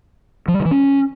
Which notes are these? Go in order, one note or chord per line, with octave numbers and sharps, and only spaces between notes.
F3
G3
D3
E3
C#4